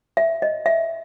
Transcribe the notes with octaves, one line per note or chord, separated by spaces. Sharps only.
E5
D#5
E5